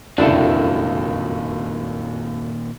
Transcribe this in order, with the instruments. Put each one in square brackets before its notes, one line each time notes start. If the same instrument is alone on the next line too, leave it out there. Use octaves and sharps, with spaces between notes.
[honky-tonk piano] F1 C#2 F#2 [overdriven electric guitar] A#2 D#3 [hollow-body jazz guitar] D4 E4 A4